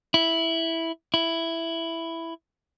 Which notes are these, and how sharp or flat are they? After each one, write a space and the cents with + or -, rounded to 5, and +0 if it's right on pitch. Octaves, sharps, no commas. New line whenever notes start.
E4 -5
E4 +5